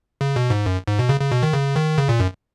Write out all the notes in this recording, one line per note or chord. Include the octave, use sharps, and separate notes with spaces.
C#3
B2
G#2
F#2
G#2
B2
C#3
C#3
B2
D#3
C#3
D#3
C#3
A#2
F#2